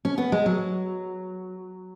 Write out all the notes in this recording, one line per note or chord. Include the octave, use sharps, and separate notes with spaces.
C#4
B3
G#3
F#3